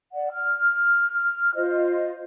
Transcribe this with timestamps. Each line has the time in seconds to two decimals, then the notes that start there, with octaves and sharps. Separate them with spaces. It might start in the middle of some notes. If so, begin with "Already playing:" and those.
0.13 D5 F#5
0.32 F6
1.54 F4 C5 D#5